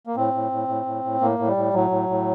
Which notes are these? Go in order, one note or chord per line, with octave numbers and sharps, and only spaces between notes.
A#3
A2 C4
A2
A2
A2
A2
A2
A2 A#3
A2
G3
A2
A2 F#3
A2
A2